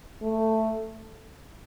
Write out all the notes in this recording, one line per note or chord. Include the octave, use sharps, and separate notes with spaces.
A3